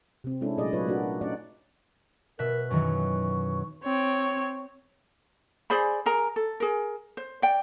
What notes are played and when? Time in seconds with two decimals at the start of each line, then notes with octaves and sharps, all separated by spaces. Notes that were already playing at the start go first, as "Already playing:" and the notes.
0.24 C3 C4
0.41 G#3 C#4 D4 E4 A4
0.58 A#2 F#3 A3 G#4 D5 D#5
0.73 F#3 A#3 F4 B4 C#5
0.87 A3 A#3 D4 D#4 F#4 D5
1.21 A3 C#4 D#4 D5 F#5
2.39 B2 A#4 E5 F#6
2.70 F#2 D#3 E3 C#6
3.84 C4 C#5
5.70 G#4 C5 D5 B5
6.06 G#4 A#4 A#5
6.36 A4
6.60 G#4 A#4
7.17 C5
7.42 D5 G5